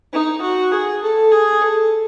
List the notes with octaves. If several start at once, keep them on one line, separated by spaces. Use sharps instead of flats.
D#4
F#4
G#4
A4
G#4
A4